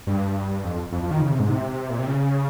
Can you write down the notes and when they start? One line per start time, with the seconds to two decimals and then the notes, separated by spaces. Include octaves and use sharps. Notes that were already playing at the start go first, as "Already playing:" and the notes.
0.07 G2
0.64 F2
0.92 F2
1.03 F2
1.11 D#3
1.21 C#3
1.31 C3
1.40 G#2
1.49 C3
1.90 A#2
1.99 C3
2.07 C#3